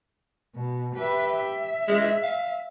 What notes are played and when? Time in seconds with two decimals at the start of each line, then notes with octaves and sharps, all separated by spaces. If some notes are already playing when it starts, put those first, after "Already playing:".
0.55 B2
0.95 G4 B4 E5
1.33 E5
1.88 G#3
2.23 F5